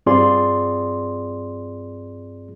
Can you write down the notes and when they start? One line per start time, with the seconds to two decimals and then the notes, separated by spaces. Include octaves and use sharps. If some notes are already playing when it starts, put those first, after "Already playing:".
0.06 G2 C4 F4 G#4 D5 C6